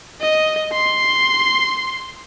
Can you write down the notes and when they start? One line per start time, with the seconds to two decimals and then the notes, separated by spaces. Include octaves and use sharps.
0.21 D#5
0.73 C6